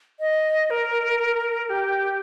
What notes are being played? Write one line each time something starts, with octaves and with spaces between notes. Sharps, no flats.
D#5
A#4
G4